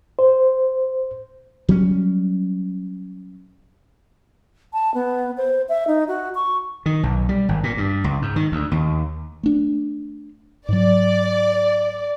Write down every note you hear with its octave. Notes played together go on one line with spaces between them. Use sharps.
C5
F#3 G3 C#4
A5
B3
C5
E5
D#4
F#4
C#6
D#3
B1
G3
G#1
A#2
G2
C#2
G#2
D#3
D2
D#2
A3 D4
G#2 F#3 D5